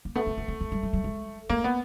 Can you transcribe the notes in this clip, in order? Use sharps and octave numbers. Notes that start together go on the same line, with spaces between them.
A#3
A3 B3
B3
B3
C4
B3
G3
F#3
G3
G#3
A3 A#3
B3